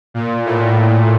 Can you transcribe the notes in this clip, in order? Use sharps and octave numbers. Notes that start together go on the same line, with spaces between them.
A#2
A2